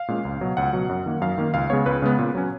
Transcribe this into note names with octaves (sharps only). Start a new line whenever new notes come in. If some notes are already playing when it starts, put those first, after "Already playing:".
Already playing: F5
A#2 G#3 C#4
C#2
B2 F#3
C#2 F#5
B2 F#3
F#2
D#3 A#3
F#2 F5
D#3 A#3
C#2 F5
C#3 G#3 B3 C#5
C#2 B4
C#3 G#3 B3
A#2
F#3 C#4